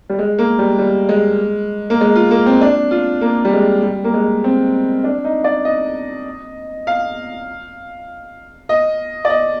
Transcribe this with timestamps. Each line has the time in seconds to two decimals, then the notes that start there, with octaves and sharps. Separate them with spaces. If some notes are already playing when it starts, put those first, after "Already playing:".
0.10 G3
0.19 G#3
0.39 A#3
0.59 G3
0.79 G3
1.09 G#3
1.90 A#3
2.01 G#3
2.16 F4
2.31 A#3
2.46 C4
2.61 D4
2.91 F4
3.21 A#3
3.45 G3
3.53 G#3
3.83 G3
4.04 A#3
4.14 G#3
4.44 C4
5.04 D4
5.25 D#4
5.44 D5
5.65 D#5
6.87 F5
8.69 D#5
9.25 D5
9.30 D#5